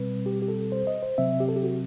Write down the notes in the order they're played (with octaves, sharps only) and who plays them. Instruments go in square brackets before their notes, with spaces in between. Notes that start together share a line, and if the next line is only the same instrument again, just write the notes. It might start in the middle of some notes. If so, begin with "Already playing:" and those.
Already playing: [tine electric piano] B2 G3 C4 B4
G4
G4
A4
C5
D#5
C5
C3 F#3 C4 E5
G4
A4
G4
F#4